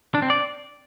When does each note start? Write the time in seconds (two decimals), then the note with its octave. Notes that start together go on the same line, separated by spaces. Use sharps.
0.15 D4
0.22 C4
0.30 D5